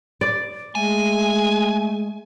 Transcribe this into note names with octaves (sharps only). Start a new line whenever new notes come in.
D5
G#3 A3 G#5